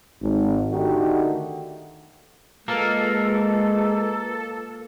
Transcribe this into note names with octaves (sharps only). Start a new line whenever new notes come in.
G#1
D3 D#3 A3 D#4 F#4 G4
G#3 A#3 F4 A4 B4 A#5